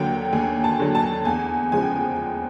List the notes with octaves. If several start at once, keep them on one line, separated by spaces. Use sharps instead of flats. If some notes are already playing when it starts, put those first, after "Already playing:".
Already playing: D#2 D3 F#3 F#5 G5
D#2 G#5
A5
D3 F#3
A5
E2 G#5
C#3 F3 G#3 G#5
G5